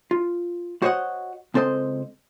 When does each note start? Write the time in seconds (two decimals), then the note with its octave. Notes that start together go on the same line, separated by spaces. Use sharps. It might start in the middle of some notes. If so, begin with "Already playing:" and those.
0.11 F4
0.82 F#4 C5 C#5 D#5 F#5
1.54 C#2 C4 A4 C5 D#5